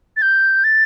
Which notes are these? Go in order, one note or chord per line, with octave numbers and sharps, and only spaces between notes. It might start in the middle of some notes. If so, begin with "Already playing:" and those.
A6
G6
A6